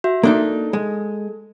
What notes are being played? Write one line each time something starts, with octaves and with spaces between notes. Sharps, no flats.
F#4 E5
A#3 D4 D#4 A4
G#3